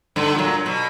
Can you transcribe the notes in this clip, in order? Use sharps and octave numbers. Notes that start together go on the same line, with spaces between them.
G2 D3
A#2 F#3
B2